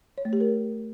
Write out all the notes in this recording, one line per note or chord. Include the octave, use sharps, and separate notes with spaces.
C#5
A3
G4
A#4